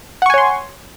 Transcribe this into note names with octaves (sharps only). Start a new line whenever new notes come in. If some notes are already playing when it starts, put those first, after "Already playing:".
C#5 F#5 G#5 C6 C#6